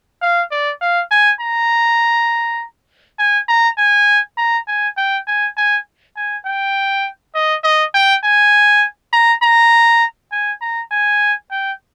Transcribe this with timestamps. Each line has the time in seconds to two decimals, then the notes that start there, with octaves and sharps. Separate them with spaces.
0.22 F5
0.51 D5
0.81 F5
1.11 G#5
1.41 A#5
3.19 G#5
3.48 A#5
3.78 G#5
4.38 A#5
4.68 G#5
4.97 G5
5.27 G#5
5.57 G#5
6.16 G#5
6.46 G5
7.35 D#5
7.64 D#5
7.94 G5
8.24 G#5
9.13 A#5
9.42 A#5
10.32 G#5
10.62 A#5
10.91 G#5
11.51 G5